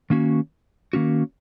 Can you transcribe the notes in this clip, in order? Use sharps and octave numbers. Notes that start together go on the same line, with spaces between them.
D#3 A#3 C#4 F#4
D#3 A#3 C#4 F#4